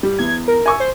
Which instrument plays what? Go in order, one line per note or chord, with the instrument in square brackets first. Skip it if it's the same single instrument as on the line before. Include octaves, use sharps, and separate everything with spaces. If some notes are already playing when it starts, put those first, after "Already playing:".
[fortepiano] G3
[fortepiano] E2 [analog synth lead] G#6
[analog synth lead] A#4
[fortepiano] G#5 C#6 E6
[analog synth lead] C5